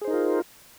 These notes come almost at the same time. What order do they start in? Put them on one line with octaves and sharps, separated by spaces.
G#4 C5 D#4 A#4 F4